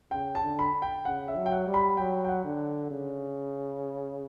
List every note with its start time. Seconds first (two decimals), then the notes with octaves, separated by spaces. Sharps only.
0.11 C#3 G5
0.35 A5
0.43 D3
0.59 B5
0.82 G5
1.05 C#3 F#5
1.28 E5
1.36 F#3
1.46 G5
1.52 F#5
1.67 G3
1.74 B5
1.97 F#3 G5
2.25 G5
2.29 F#5
2.44 D3
2.90 C#3